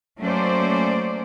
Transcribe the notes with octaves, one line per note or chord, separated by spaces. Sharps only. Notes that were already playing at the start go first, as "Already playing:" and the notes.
F#3 A3 A#3 C#4 C5 D5